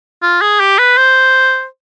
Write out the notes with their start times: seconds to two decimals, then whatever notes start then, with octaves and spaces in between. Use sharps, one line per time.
0.22 F4
0.41 G#4
0.60 G4
0.79 B4
0.97 C5